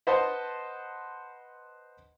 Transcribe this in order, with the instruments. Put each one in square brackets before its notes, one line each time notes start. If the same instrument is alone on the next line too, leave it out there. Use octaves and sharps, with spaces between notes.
[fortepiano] B4 C5 D#5 F#5 A5 C6